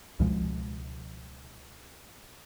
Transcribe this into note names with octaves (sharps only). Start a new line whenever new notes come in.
C#2 B2 F3 G#3